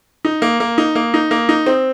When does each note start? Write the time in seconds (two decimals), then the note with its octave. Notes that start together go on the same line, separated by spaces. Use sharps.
0.25 D#4
0.42 A#3
0.60 A#3
0.78 D#4
0.95 A#3
1.14 D#4
1.31 A#3
1.49 D#4
1.66 C4